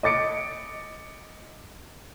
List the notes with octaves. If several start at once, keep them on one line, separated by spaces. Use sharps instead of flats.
D#5 D6 A6 C#7 D7